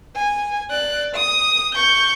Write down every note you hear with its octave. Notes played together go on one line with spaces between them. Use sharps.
G#5
D5 F#6
D#6
C#6 G6